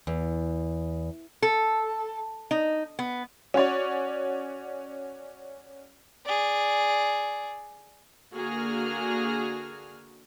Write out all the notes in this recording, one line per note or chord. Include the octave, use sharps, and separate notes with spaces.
E2
A4
D#4
B3
C#4 F#4 C#5 D5
G#4 D5
D3 A#3 F#4 G#4 F6